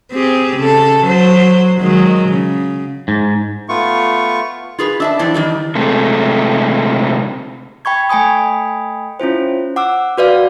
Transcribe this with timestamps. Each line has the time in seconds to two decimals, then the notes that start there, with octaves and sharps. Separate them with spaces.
0.11 C4 G4 G#4
0.56 C#3 A4
1.04 F#3 C5
1.80 D#3 F#3 G#3
2.29 C#3
3.08 G#2
3.69 A3 B3 F4 C#6
4.79 F4 G#4 B4
5.00 D4 E5 A5
5.19 E3 F3 C4 D4
5.34 D#3 E3 G3
5.75 C3 G#3 A3
7.85 G5 B5 C#6 G#6
8.09 A3 G5 G#5 B5 D#6
9.20 C#4 E4 F4 C5
9.76 F#5 D6 E6
10.18 F#4 B4 D5 F5